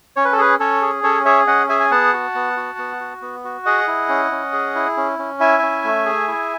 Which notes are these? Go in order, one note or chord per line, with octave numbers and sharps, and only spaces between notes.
C#4 C#5
B4
A4
G#4 B4
C#4 A4 C#5
G#4
C#4 A4 C#5
G#4 C#5 E5
C#4 D#5 F#5
G#4 E5 G#5
G#5
B3 F#5 A5
F#4
B3
F#4
B3
F#4
B3
F#4
G#4 D#5 F#5
E4
C#4
C#4
G#4
E4
C#4
C#4
E4 E5 G#5
C#4
A3
G#4
E4